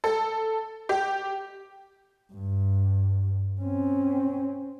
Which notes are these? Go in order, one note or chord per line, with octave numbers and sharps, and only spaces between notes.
A4
G4
G2
C4 C#4